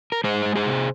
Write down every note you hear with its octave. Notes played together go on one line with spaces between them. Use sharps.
A#4
G#3 G#4 C5
G#3
G#4 C5
C3